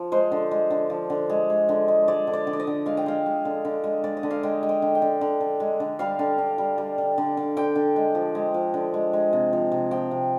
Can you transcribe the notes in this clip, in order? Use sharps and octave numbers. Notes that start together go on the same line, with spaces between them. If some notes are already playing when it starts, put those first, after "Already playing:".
Already playing: F3
G#3 C5
D3
G#3
D3
F3
D3
G#3
G#3
D3
G#3
G#3 D5
D3
D5
D3
D5
D#5
D3
G#3 F5
G5
G#3 F5
G#3
D3
D3
G#3
G#3 D5
D#5
D3
F5
G#3 G5
G#3
G5
D3
G5
D3
D3
D3
G#3
D3
G3 F5
D3
D3
G3
G3
D3
D3
D3
D3 G5
D3
G#3
F3
G#3
F3
D3
G#3
G#3
C3
F3
C3
F3 G5
C3